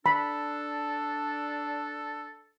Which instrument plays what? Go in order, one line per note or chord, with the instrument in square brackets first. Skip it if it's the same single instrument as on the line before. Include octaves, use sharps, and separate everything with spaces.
[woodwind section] D4 [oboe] A4 [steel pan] B5